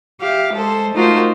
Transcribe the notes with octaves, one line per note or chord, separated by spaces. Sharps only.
G4 E5 F5
G#3 A4 C5
A3 D#4 F4 F#4 A#4 C5